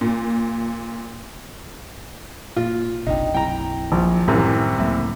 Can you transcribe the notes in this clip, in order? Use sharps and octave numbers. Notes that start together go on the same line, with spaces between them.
A#2
A#2 F4
F#1 B1 C3 D4 D#4 G5
F#3 C4 E4 G5 A#5
A#1
C2 F#2 A2 C3 D#3 E3
C#2 A2 F#3 A#3 E4 E5